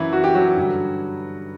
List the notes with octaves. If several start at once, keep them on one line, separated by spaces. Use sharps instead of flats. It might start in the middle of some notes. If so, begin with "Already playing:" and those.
Already playing: F#2 E3 F#3 E4
F#4
G4
F#3 F#4
G2 D3 G3